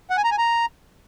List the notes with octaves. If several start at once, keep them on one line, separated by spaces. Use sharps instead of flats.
F#5
G#5
A#5
G#5
A#5